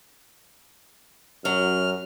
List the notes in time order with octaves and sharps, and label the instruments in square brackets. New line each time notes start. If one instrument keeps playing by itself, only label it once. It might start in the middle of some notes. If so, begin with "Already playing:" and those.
[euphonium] F#2 [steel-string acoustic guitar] F#3 [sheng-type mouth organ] F6